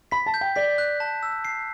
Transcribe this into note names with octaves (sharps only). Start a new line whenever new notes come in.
B5 B6
A5
G6
G5
D5 B6
F#6
A5
E6
C7